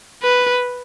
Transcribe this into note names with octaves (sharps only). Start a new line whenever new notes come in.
B4